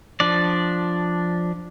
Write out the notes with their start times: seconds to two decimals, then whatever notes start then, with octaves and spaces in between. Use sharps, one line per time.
0.20 F3 D4 D5